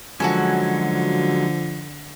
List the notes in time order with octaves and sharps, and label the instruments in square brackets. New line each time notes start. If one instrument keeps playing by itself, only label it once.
[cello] D3 [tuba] F3 [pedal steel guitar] F#3 G#3 C#4 [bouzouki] F#4 A4 G#5